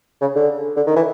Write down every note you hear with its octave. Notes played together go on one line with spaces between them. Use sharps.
C#3
D3
D3
D#3
E3